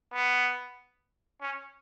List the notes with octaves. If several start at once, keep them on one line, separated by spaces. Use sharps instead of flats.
B3
C#4